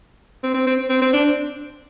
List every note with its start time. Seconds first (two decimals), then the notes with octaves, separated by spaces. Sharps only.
0.43 C4
0.54 C4
0.67 C4
0.90 C4
1.02 C4
1.13 D4